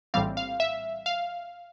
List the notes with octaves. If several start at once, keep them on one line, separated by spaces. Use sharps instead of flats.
A#1 A2 E3 G3 C4 F5
F5
E5
F5